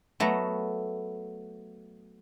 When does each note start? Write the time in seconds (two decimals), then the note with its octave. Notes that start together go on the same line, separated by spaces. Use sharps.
0.20 F#3 A3 B3 A#5